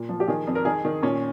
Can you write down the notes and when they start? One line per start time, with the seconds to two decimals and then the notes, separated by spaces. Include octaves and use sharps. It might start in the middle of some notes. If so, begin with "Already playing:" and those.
Already playing: A#2
0.09 F3
0.20 G4
0.28 D#3 G#4
0.47 F2
0.55 A#4
0.65 D#3 G#4
0.85 D#3
1.03 A#2 C#4